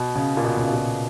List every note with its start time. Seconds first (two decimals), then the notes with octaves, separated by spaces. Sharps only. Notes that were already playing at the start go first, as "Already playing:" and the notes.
Already playing: B2
0.16 C#3
0.37 A#2
0.45 B2
0.57 C#3
0.66 B2
0.73 A#2